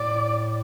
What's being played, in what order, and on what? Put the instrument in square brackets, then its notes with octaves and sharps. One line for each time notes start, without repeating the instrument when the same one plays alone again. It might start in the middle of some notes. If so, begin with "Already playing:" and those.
Already playing: [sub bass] A2 [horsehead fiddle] D5